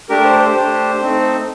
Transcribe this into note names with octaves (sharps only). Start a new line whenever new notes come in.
A3 D4 G4 A#4
C5
C5
A3 D4 G4
A3 C4 D#4